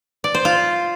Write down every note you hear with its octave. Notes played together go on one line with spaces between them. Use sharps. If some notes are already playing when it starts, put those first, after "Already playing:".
D5
C5
F4